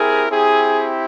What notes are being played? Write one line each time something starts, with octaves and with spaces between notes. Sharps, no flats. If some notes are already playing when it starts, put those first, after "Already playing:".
Already playing: C4 E4 G4 G#4 A#4
C4 E4 G4 G#4